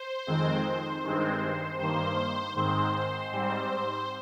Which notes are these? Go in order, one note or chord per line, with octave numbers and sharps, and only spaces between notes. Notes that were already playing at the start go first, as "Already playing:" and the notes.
Already playing: C5
F2 D#3 G#3 C4
G2 D#3 G#3 C4
G2 D#3 A#3 C5
G#2 D#3 G#3 C4 C5
G#2 G3 C4 C5